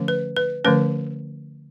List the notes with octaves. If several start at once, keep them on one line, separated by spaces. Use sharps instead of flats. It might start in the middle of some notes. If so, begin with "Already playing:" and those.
Already playing: D3 F3 A3 C#4
B4
B4
D3 F3 A3 C#4 B4